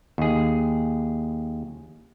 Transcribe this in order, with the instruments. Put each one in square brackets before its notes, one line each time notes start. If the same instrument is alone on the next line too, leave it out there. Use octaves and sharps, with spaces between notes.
[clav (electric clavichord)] D#2 G#4